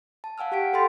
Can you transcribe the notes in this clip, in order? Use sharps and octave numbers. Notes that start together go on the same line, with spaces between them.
A5
F5 F#5 G#5 E6 F6
G4 F#5 G5 B6 D7
A4 G5 B5 C6 A6